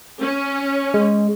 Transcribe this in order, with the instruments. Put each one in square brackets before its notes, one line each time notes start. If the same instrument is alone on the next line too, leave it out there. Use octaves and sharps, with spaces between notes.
[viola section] C#4
[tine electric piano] G#3